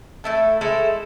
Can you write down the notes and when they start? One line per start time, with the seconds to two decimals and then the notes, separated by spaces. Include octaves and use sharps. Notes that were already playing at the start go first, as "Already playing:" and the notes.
0.24 A3 E4 A4
0.61 G#3 E4 A4 C5